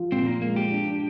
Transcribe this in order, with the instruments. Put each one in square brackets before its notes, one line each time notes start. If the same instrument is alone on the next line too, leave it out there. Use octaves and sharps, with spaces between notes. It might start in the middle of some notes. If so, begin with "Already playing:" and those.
Already playing: [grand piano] F3
[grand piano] A#2 [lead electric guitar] C4
[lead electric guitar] A#3
[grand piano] G#3 [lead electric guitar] A#3
[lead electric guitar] G4
[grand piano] D4